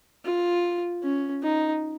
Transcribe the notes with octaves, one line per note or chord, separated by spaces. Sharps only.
F4
C#4
D#4